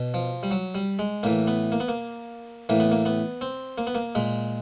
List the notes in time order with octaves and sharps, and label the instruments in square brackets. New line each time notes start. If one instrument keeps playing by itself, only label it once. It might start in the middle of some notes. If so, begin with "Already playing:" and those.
Already playing: [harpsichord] B2
F3
G3
F#3
G3
G#3
A2 E3 A#3
B3
A#3
B3
A#3
A2 E3 A#3
B3
A#3
B3
C4
A#3
B3
A#3
A#2 G#3